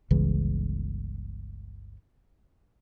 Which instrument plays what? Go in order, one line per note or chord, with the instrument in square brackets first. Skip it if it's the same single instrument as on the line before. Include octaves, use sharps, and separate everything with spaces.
[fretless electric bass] G1 C#2 C#3 E3